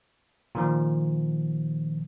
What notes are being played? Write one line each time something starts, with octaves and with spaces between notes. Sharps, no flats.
A#2 D#3 F3